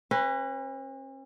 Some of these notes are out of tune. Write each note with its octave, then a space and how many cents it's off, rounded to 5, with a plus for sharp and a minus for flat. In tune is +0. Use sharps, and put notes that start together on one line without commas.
C#4 -45 B4 +0